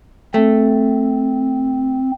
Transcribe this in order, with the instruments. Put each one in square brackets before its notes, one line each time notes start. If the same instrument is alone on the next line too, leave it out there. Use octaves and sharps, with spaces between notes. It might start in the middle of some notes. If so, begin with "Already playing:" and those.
[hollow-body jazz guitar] A3 [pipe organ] C4